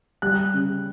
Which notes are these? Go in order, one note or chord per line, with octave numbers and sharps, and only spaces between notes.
G3 F#6
C#3